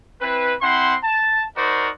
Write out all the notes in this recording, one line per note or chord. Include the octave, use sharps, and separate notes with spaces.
C4 E4 B4
C4 E4 C5 F#5 C6
A5
D#4 F#4 A#4 C5 D5